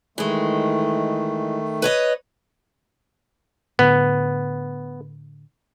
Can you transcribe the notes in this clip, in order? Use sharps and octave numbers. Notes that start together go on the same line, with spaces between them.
D#3 E3 G#3 A3
B4 C#5 D#5
A2 D3 B3